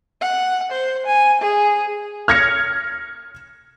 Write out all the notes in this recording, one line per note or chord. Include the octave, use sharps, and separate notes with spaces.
F#5
C5
G#5
G#4
F6 G#6 A#6 C#7